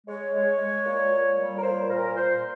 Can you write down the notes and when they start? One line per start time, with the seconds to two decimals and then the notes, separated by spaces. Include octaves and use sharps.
0.07 G#3 C#5
0.33 G#3
0.59 G#3
0.85 A#2
1.12 A#2
1.37 G3
1.56 A#4
1.63 A#2 C5
1.89 A#2 A#4
2.15 A#2 C5